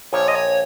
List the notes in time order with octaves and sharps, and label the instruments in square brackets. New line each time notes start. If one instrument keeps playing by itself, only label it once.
[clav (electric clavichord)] A#1 A#2 F3 [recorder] C#5
[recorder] D#5
C#5